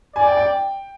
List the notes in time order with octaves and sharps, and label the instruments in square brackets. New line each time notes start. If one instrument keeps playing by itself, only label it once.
[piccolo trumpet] D5 [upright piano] G#5
[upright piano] G5
G5